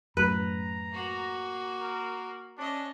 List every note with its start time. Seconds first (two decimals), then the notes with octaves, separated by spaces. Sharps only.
0.17 F#2 A2 B4 A#5
0.93 A#3 F#4
1.81 A#4
2.58 C#4 D4 D#5